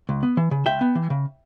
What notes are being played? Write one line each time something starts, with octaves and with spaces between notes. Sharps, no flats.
C#2
B3
E3
C#3
C#2 E5 G5
B3
E3
C#3